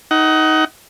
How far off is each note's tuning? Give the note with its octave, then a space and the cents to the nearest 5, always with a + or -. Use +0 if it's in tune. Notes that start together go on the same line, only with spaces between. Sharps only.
D#4 +15 F#5 +30